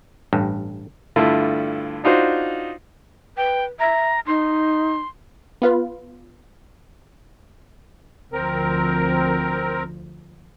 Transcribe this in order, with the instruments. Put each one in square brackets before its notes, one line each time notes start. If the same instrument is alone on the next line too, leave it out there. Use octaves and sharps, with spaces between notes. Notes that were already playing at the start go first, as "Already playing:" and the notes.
[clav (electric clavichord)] A1 G2
[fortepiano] G2 D3 A3 E4 F4
D4 D#4 F4 F#4 C5
[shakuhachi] B4 [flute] G5
[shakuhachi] E5 [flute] A#5
[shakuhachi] D#4 [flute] C6
[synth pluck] B3 F4 B4
[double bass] D2 F3 [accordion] C4 A#4